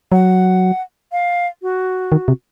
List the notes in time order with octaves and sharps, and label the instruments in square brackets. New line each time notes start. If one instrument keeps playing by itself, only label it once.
[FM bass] F#3 [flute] F#5
[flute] F5
F#4
[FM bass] D#3
C3